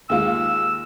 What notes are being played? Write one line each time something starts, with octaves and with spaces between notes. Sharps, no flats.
D#2 G#3 F4 E6